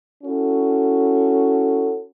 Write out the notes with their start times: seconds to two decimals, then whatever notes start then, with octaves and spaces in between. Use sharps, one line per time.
0.24 C#4 E4 F#4 A4